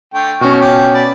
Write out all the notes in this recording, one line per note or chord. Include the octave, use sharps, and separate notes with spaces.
D3 A3 G5
B2 C#4 F#4 C#6 F6
F3 G5 D6
D5 B5